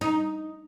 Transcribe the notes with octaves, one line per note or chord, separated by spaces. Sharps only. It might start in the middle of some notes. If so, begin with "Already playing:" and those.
D#4